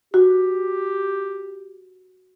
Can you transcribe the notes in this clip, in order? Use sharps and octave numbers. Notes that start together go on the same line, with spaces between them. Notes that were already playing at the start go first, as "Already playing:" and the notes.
F#4 G4